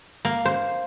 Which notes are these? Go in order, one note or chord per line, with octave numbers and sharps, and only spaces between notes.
A#3
C5